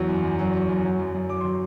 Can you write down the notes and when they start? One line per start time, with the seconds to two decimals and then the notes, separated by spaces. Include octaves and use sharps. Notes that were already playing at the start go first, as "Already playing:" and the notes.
Already playing: E2 F#3
0.09 F#2
0.24 F#2
0.39 F#3
0.53 F#3
0.69 F#2
0.84 F#3
0.99 F#2
1.15 F#2
1.29 F#3 D6
1.41 F#3 C6